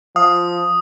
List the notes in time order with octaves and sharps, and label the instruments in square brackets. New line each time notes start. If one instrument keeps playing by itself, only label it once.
[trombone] F3 [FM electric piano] F5 [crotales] D#6